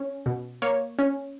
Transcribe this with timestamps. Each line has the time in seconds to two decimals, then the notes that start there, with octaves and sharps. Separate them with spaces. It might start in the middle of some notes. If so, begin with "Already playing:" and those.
Already playing: C#4
0.26 B2
0.62 A#3 C#5
0.99 C#4